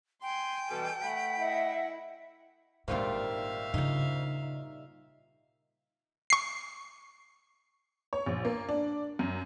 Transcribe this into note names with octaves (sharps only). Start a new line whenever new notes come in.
G5 G#5 C6
B2 E3 G3 A4
A3 F#5 B5
E4 D#5 E5 F#5
G#1 A#2 G3 A#3 D#4 F4 E5 F5
C#3 D#4 F4
C#6 C7
C#5
A#1
A#3
D4
F#2